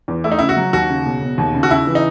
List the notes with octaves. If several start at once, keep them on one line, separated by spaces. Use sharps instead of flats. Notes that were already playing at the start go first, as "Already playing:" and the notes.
E2
A3 E4
D#4
C#3 E4
F#4
F#3
D#2 F#4
C#3
E1
E1
D#2
C#3
F#4
C#3 E4
E3
D#4